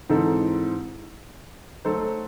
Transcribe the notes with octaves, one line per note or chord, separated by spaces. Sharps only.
G#2 E3 C4 D#4 A4
F#3 A3 D#4 A4 C5